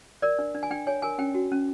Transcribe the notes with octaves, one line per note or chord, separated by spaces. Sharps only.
A#4 D5
D4
D4
G#5
D4 G5
C#5 G#5
A#4 G#5
C#4 G5
F#4
C#4